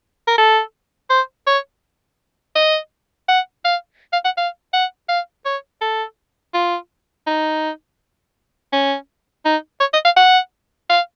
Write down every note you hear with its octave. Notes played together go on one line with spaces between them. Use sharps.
A#4
A4
C5
C#5
D#5
F#5
F5
F5
F#5
F5
F#5
F5
C#5
A4
F4
D#4
C#4
D#4
C#5
D#5
F5
F#5
F5